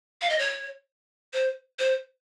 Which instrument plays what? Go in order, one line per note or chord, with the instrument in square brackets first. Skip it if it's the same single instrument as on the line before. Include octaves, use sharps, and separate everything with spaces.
[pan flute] F5
D#5
C#5
C5
C5